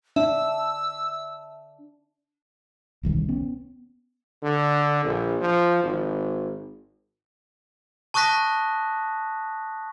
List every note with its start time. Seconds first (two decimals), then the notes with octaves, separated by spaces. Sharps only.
0.16 D4 E5 E6
3.03 D#1 C2 D#3
3.29 B3 C#4
4.43 D3
5.05 A#1
5.41 F3
5.84 G#1
8.14 A5 C#6 D#6 F#6 A#6 B6